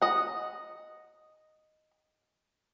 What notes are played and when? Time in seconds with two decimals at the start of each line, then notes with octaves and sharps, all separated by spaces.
0.02 D#5 F#5